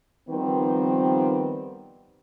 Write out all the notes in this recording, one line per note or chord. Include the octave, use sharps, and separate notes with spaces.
D#3 F3 G3 B3 C4